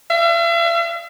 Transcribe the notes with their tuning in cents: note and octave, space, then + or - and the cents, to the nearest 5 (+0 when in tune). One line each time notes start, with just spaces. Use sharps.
E5 +45